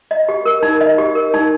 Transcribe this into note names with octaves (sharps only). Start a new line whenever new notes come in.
D#5
G4
A#4
D#4
D#5
G4
A#4
D#4